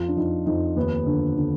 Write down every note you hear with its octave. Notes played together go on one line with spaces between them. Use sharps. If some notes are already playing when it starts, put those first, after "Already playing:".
Already playing: F2 F4
D4
F2 D#4
F2 D#4
D#2 B3
D3
D3